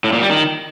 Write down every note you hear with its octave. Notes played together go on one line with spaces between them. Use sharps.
A2
A#2
G3
D#3